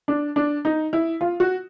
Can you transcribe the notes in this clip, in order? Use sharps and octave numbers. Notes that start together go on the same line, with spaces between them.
D4
D4
D#4
E4
F4
F#4